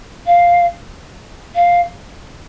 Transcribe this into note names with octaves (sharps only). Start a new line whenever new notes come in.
F5
F5